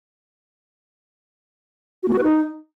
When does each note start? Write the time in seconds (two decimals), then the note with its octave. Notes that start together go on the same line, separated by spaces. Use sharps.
2.03 F#4
2.08 A#3
2.13 F#4
2.18 B4
2.23 D#4